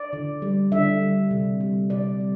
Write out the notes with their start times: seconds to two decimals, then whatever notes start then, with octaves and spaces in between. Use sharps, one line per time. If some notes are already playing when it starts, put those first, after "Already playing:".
Already playing: D5
0.13 D3
0.42 G3
0.72 D3 E5
1.01 G3
1.31 C3
1.61 G3
1.90 C3 D5
2.20 G3